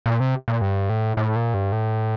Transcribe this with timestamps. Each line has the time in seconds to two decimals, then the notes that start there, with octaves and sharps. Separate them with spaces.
0.06 A#2
0.20 C3
0.48 A#2
0.61 G2
0.90 A2
1.17 A2
1.36 A#2
1.54 G2
1.72 A2